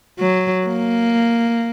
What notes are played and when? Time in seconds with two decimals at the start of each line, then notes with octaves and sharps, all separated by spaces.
0.19 F#3
0.67 A#3